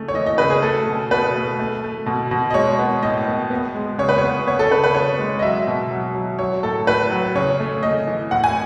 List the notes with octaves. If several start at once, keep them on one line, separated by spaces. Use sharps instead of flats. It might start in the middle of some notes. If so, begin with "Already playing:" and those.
Already playing: C#3 A3
C#5
E3 D#5
D#5
C#3 B4
G#4
A3 A4
B2
B2 B4
A3
A3
A3
B2
B2
D#5
G#3 C#5
B3
A2 D#5
B3
B3
G#3
C#3 C#5
B4
B3 C#5
B3 C#5
A4
C#3 B4
B4
C#3 C#5
G#3
D#5
F#3 E5
B2
F#3
F#3
F#3 C#5
A2 A4
A2 B4
F#3
C#3 C#5
A3
A3 D#5
E3
A2 F#5
G#5